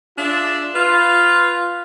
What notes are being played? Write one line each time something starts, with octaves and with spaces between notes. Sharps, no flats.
D4 F4 G#4 D5 E5
F4 B4